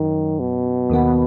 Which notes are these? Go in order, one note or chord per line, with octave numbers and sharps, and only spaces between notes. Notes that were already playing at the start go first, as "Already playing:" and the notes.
Already playing: F#2 D#3 F#3
B2
D#2 D#3 B3